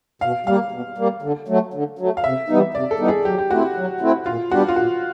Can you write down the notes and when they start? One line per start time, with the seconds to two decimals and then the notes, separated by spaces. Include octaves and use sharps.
0.21 B2 F5
0.46 G3 A#3 F5
0.72 B2
0.98 G3 A#3
1.22 D3
1.48 F#3 A3
1.74 D3
1.99 F#3 A3
2.17 F5
2.24 C3 E5
2.48 E3 G3 B3 D#4
2.74 C3 D5
2.91 A4
2.99 E3 G3 B3 D#4
3.08 G#4
3.25 F#3 G4
3.38 G4
3.50 A3 C4 E4 F#4
3.76 F#3
4.01 A3 C4 E4
4.26 A#2 F4
4.51 G3 B3 D4 F#4 G4
4.68 F4
4.76 A#2 F#4